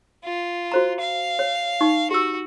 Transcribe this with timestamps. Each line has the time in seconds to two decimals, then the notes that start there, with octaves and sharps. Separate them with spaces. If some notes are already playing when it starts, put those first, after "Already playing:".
0.24 F4
0.72 F#4 C5 A#5
1.01 F5
1.39 C#5
1.81 D#4 C#6
2.11 F#4 G4 E6